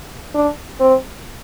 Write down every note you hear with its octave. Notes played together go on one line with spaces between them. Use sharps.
D4
C4